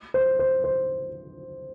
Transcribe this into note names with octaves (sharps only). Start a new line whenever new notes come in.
C5
C5
C5